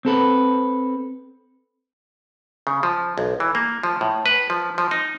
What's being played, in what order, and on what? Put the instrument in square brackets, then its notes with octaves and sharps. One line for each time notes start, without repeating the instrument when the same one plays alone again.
[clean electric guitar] C4 A4 B4
[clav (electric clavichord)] C#3
F3
B1
E3
A#3
F3
A2
B4
F3
F3
D#4